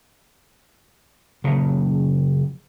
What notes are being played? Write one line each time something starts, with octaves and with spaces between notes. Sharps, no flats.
F#1 A#2 C#3